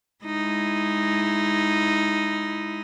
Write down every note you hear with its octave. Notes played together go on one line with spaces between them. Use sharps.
G#3 D#4 E4